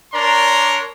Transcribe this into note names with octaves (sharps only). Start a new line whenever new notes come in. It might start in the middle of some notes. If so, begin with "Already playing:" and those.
D4 A#4 C#5 D5 A#5 C6